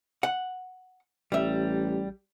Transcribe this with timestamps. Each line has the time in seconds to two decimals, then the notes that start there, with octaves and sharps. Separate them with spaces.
0.23 F#5
1.32 A1 G3 E5